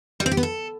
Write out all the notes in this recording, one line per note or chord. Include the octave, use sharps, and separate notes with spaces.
G3
C4
G4
B3
A4